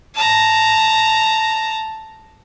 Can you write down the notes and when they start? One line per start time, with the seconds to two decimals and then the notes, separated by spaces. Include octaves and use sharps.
0.15 A5 A#5